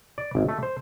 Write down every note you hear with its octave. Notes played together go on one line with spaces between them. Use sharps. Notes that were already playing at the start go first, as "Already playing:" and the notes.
D5
G#1
A3
C5